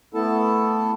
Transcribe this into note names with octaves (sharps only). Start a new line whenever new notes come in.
A3 B3 E4 A4 A5